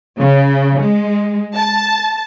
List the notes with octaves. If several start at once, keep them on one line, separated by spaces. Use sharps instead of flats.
C#3
G#3
A5